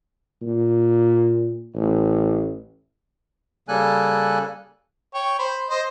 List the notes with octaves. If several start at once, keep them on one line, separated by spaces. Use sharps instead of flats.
A#2
A1
C#3 G3 A#3 A4 G#5 F#6
C#5 G5
C5 B5
C5 D#5